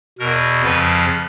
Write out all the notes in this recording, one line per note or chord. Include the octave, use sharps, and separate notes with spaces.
E2 B2 A#4
F2 C#3 F3 B4